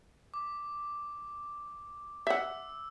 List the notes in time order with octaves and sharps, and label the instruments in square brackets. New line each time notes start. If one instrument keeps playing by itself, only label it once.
[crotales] D6
[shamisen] E5 F#5 [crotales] E6